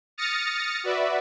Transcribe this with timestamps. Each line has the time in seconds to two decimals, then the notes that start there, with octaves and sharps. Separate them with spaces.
0.18 D#6 F6 A6 A#6 C#7
0.84 F#4 B4 D5 E5